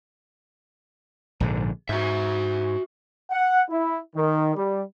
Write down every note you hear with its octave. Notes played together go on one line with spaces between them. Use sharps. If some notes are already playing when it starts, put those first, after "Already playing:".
A#1 G#2 D3
G#2 F#4 E5
F#5
E4
D#3
G3